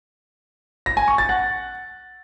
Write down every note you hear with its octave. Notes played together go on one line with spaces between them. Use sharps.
A#6
G#5
C#6
A6
F#5